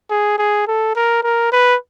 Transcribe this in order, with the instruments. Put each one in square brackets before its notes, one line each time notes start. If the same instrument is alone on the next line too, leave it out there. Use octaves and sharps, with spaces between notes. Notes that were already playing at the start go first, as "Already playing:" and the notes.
[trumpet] G#4
G#4
A4
A#4
A#4
B4